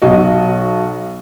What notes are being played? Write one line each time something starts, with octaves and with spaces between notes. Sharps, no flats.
B1 F#4 D#5